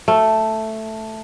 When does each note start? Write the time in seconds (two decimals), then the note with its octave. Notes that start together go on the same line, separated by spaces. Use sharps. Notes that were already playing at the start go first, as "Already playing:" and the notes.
0.08 A3